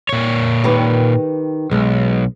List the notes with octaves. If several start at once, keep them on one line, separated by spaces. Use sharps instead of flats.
A#2 C#5
D#3 G4 B4
B1 G#3